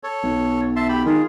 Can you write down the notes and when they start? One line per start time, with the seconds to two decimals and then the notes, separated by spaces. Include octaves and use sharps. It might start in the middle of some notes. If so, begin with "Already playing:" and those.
0.03 A4 C#5
0.24 B1
0.76 E5 A5 C6
0.89 G4 B5
1.06 D#3 F4 G#4